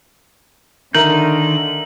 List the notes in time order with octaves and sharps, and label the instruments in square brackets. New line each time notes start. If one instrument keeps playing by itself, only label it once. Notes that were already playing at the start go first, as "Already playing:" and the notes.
[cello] D3 [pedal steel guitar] D#3 D#4 G6 [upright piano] A#4 E5 A#5 [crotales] F#7